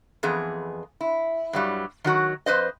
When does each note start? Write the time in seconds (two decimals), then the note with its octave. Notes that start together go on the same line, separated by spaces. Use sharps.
0.23 F2 E3 B3 G#4
1.01 E4
1.53 G2 F#3 G3
2.04 D#3 F#3 F#4
2.46 F2 B4 C5 D#5